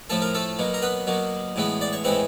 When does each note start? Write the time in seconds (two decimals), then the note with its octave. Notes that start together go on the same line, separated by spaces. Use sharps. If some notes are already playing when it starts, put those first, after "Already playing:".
0.10 A2 F3 A3 A4
0.22 A#4
0.34 A3 A4
0.59 B2 F#3 A#3
0.74 A#4
0.82 B3 B4
1.07 B2 F#3 A#3
1.56 A2 E3 G#3 B3
1.81 D5
1.93 C#5
2.04 A2 E3 G#3 B3 C4 C5